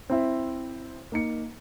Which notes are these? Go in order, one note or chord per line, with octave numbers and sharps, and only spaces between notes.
C4 E4 E5
A#3 D#4 C#7